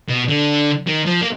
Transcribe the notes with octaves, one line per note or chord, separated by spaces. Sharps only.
B2
D3
D#3
F3
A#3